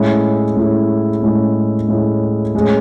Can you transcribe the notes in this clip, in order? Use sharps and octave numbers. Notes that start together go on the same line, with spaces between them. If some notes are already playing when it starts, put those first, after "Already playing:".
Already playing: A2 G#3 C#4 E4
A2 G#3 C#4 E4
A2 G#3 C#4 E4
A2 G#3 C#4 E4
A2 G#3 C#4 G#4